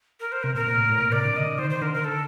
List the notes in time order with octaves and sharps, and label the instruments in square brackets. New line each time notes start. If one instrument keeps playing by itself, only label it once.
[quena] A#4
C5
[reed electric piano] C3 [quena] A#4
[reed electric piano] A#2 [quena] A#4
[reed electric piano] A#2
A2
A2
A#2
[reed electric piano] C3 [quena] D5
[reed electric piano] D3
[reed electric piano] C3 [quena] D#5
[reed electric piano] D3
[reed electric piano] D#3 [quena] C5
[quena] C5
[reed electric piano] D3 [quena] A#4
[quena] A#4
A4